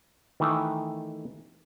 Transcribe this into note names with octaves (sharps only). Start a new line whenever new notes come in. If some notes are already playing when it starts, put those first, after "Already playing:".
D#3 E3 A3